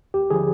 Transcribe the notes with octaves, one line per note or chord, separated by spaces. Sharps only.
D#2 G4
D3 F3 G#4